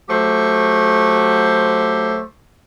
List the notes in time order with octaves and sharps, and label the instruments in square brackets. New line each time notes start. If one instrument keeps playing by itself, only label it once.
[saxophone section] F#3 A3 G4 C5